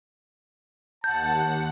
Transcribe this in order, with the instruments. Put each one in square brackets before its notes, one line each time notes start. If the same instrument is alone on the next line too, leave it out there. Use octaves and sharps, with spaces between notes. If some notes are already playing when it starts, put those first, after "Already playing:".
[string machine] D#2 F#5 [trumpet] A5 [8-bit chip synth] G6